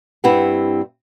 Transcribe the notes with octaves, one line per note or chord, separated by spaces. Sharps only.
G2 C4 E4 G4 B4 F#5